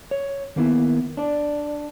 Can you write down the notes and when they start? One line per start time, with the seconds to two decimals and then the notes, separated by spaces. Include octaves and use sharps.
0.11 C#5
0.56 D#3 A#3 B3 E4
1.17 D4 D5